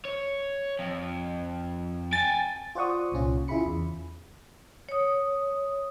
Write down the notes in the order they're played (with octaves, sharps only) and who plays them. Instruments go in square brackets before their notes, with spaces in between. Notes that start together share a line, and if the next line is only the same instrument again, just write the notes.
[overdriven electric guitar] C#5
F2
[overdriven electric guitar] G5 G#5 [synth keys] A6
[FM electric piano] F4 C5 D5 F#5 C#6 D#6
C2 A#2 C#4 F4
C#3 E4 F4 G#4 B5 C#7
E2
[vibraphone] C#5 D#6